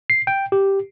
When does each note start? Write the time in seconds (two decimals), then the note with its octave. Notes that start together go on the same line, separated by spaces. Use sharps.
0.10 C7
0.27 G5
0.52 G4